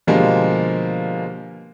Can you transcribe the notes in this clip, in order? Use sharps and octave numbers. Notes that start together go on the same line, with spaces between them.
B2 D3 F3 G3 G#3 A#3